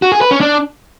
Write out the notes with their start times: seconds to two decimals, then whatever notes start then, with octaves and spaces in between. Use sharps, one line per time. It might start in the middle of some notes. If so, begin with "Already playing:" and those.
0.02 F#4
0.12 G#4
0.21 B4
0.31 C#4
0.41 D4